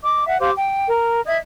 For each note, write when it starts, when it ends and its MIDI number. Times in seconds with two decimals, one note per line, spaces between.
0.03 0.25 75
0.03 0.25 86
0.26 0.38 76
0.26 0.38 78
0.40 0.51 67
0.40 0.51 72
0.40 0.51 77
0.40 0.51 86
0.57 0.87 79
0.88 1.21 70
1.26 1.37 75
1.26 1.37 76
1.26 1.37 92